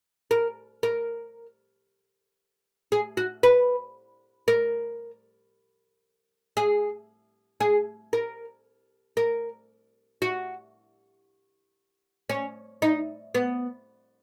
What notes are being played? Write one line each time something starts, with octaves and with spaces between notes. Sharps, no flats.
A#4
A#4
G#4
F#4
B4
A#4
G#4
G#4
A#4
A#4
F#4
C#4
D#4
B3